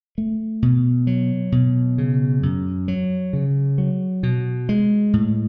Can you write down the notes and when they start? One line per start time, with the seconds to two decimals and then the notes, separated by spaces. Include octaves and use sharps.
0.18 A3
0.62 B2
1.07 F#3
1.52 B2
1.98 C#3
2.43 F#2
2.88 F#3
3.33 C#3
3.78 F#3
4.23 B2
4.69 G#3
5.13 A2